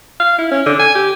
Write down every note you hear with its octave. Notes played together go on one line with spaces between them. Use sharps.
F5
E4
C#4
D3
G#5
G4